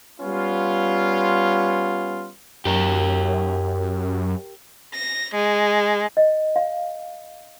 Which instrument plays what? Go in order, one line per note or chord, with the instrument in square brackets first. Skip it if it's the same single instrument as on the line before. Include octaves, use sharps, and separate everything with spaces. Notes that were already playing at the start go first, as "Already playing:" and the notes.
[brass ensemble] G3 B3 C#4 F4
[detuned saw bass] F#2 [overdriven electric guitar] G4 A#4
[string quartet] A#6
G#3
[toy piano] D#5
F5